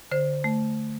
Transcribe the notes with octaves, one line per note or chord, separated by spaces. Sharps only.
D3 C5
A3